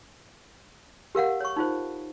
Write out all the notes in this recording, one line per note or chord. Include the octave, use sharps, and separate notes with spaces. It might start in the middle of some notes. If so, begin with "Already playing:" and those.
G4 A#4 F5 F#5
C#5 C#6
D#4 F4 C5